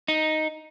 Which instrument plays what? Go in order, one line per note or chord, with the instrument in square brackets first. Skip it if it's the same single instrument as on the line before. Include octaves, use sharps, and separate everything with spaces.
[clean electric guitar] D#4